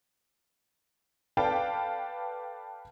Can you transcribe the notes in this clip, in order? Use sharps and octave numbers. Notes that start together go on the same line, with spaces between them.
A4 B4 D5 F5 G5 A5